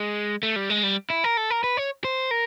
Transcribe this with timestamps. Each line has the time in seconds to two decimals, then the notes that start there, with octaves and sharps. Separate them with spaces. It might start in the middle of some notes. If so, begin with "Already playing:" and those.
Already playing: G#3
0.43 A3
0.56 G3
0.70 G#3
0.83 G3
1.10 E4
1.24 A#4
1.37 A4
1.50 A#4
1.64 B4
1.77 C#5
2.04 C5
2.31 A#4